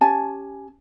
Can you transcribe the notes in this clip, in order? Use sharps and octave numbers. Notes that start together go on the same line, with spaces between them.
C#4 G4 G#5 A5